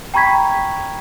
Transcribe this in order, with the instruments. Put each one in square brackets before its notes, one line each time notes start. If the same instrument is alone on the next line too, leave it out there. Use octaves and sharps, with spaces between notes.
[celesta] G5 A#5 B5 C#6 G#6 B6